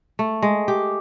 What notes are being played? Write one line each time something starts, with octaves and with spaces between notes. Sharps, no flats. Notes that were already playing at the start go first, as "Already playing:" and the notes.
A3
G#3
G4